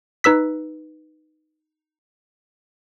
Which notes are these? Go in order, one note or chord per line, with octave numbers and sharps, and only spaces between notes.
D#4 B4 E6 B6